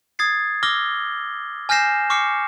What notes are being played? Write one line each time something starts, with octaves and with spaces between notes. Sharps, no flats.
D#6 G#6 A6 C7
D6 E6 F6 A#6 G7
G#5 F6 G6 A#6 C7 E7
C#6 D6 F6 C7 C#7